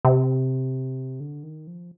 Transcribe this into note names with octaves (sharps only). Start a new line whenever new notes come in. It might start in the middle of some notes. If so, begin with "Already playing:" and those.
C3
D3
D#3
F3